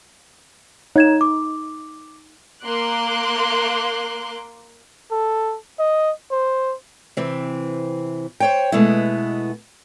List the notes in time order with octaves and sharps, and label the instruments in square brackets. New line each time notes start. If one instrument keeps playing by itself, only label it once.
[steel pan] D#4 [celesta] C#5 G#6 E7
[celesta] D6
[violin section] A#3 C6 D6 F#6
[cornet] A4
D#5
C5
[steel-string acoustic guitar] C3 E3 C4
C5 C#5 G5
B2 G#3 A3 B3 E4